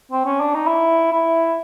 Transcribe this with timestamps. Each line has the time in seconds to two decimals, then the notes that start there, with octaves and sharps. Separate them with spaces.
0.12 C4
0.26 C#4
0.40 D4
0.54 D#4
0.67 E4
1.12 E4